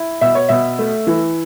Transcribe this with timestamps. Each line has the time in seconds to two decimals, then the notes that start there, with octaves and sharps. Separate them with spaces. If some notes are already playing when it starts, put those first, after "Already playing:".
Already playing: E4
0.21 B2 E5
0.35 C#5
0.49 B2 E5
0.79 A3
1.07 E3